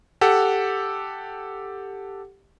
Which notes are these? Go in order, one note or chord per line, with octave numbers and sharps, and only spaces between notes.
G4 A4 F#5